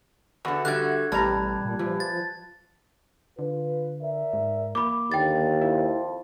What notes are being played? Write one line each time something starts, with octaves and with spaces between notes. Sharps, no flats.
E2 D3 F#4
D3 G3 A3 F#6 G#6
A1 B2 G3 A5 A#5
A#2
E2 F3
A6
D3 F4 B4
A#4 D5 E5
G#2
A#3 B5 D6
D#2 D3 G5 A6
F2 E4